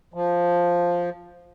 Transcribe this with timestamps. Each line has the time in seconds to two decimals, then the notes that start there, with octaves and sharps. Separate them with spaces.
0.14 F3